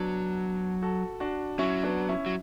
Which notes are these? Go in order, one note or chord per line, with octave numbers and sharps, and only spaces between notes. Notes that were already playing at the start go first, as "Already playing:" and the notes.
Already playing: F#3 B3 D4
F#4 A4
D4 F#4
F#3 C#4 E4
B3 D4
C#4 E4
F#3